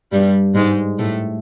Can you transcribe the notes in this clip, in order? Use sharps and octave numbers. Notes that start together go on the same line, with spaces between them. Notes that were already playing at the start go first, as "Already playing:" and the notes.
G2 G3
G#2 G#3
A2 A3